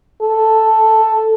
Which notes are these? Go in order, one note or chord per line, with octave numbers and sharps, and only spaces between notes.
A4